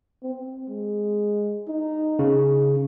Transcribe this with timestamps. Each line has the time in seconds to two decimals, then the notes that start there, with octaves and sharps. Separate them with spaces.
0.23 C4
0.69 G#3
1.68 D#4
2.19 C#3